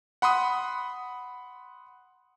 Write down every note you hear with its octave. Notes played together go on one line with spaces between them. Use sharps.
F#5 B5 C6 D#6